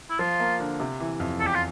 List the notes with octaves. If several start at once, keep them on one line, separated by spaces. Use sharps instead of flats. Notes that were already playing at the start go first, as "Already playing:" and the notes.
E4
F3 F4
A#3
D3
C3
E3
F2
E2 A4
G4
F4